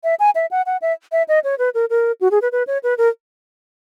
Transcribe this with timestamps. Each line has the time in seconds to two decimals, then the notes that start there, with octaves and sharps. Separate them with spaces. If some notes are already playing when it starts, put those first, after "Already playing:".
0.04 E5
0.20 G#5
0.35 E5
0.51 F#5
0.66 F#5
0.82 E5
1.12 E5
1.28 D#5
1.44 C#5
1.59 B4
1.74 A#4
1.90 A#4
2.21 F#4
2.31 G#4
2.42 B4
2.52 B4
2.67 C#5
2.83 B4
2.98 A#4